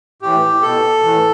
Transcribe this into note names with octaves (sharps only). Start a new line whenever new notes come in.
A2 E3 G4
B2 A4
A2 E3